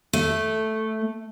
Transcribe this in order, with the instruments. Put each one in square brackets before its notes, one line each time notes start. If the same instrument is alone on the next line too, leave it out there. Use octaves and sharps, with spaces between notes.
[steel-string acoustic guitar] A3